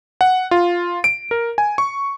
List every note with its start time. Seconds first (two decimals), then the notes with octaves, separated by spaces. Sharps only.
0.21 F#5
0.51 F4
1.04 D7
1.31 A#4
1.58 G#5
1.78 C#6